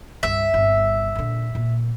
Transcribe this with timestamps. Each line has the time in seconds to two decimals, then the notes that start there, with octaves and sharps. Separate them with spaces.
0.23 C2 G2 E5
0.54 G1 C3
1.15 A#2 D3
1.55 A#2